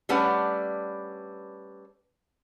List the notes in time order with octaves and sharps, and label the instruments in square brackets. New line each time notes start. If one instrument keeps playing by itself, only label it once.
[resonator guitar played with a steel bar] G3 A3 C#4 D4 B4 F#5